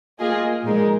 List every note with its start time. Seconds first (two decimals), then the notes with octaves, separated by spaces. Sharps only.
0.19 A#3 F4 G#4 D#5
0.63 A#2 F3 G#3 D#4 A#4